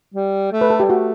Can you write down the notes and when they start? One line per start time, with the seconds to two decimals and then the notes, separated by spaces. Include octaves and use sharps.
0.14 G3
0.52 A3
0.61 B4
0.70 A4
0.80 G3 G4
0.89 A3 F#4